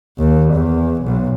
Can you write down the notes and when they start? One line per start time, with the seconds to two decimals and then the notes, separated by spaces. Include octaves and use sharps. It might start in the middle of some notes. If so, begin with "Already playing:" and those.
0.18 D#2
0.53 E2
1.02 B1